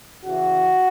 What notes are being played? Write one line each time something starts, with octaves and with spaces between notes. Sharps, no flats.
C#3 E3 F#4